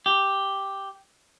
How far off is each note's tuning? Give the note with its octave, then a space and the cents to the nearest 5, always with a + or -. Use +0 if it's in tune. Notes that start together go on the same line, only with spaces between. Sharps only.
G4 +0